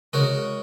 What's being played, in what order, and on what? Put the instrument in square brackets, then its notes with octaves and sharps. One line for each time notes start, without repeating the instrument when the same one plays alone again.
[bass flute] C#3 [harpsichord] G#3 F#4 A#4 C#5